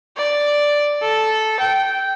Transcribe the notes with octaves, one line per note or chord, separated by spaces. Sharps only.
D5
A4
G5